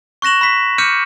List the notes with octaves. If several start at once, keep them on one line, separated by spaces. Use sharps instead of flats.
C#6 F#6 A#6 E7 F#7
B5 B6
D6 F6 G6 C#7 D#7